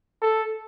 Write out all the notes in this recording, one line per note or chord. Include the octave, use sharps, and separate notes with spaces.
A4